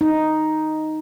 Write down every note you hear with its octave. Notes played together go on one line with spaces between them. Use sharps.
D#4